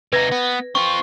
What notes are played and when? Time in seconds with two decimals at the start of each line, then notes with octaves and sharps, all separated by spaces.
0.13 C3 D#4 B4 G#6 A#6
0.31 B3
0.75 C4 F4 C#6